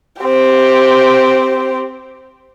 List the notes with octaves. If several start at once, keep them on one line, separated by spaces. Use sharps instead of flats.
C4 G4